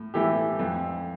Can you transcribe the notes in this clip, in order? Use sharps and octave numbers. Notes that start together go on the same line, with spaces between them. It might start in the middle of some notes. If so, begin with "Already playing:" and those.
Already playing: A2
E3 A3 E4 G4
F2